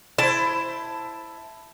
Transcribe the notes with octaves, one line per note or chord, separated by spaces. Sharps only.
E4 C5 A5